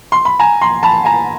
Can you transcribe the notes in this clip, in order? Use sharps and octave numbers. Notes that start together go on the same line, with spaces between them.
C6
B5
G#5 A#5
A#5 C6
A5 B5
G#5 A#5